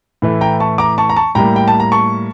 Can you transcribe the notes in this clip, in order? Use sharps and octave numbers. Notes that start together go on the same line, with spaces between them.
A2 E3 A3
G5 A#5
A5 C#6
A#5 D6
A5 C#6
A#5
A5 C#6
A2 G3 A#3 G5 A#5
G5
A5
A#5
A5 C#6